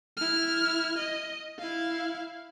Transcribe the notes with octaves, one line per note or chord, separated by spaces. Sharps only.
E4 F6
D#5
E4 F5